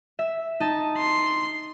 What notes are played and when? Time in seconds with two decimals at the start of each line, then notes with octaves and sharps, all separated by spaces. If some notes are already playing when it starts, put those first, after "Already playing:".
0.19 E5
0.60 D#4 A5
0.97 C6